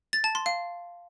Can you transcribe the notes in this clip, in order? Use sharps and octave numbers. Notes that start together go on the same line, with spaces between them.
A6
A5
C6
F5